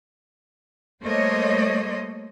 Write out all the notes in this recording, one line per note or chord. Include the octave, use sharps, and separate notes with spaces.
G3 A3 A#3 C5 C#5 D#5